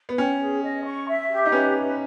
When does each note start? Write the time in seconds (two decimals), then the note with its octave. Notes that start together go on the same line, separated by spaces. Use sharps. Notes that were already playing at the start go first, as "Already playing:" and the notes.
0.09 B3
0.18 C#4 G5
0.40 G#4
0.62 D#5
0.85 C#6
1.08 E5
1.30 G4
1.46 D#4
1.52 C#4 B4